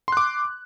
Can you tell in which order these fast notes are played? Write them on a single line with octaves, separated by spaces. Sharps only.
C6 F#6 D6